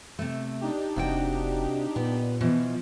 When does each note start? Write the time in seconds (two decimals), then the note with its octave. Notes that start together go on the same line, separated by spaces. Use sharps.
0.19 C3 A3
0.61 D4 D#4 G4
0.96 F1 C3 F#4 G5
1.96 A#2 B3
2.41 B2 E3 F3